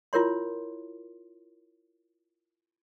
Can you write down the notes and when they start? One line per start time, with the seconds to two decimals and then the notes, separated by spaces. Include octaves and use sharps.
0.13 E4 F4 A#4 C#5 C6